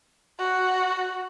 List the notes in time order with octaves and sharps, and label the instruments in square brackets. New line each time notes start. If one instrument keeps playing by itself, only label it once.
[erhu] F#4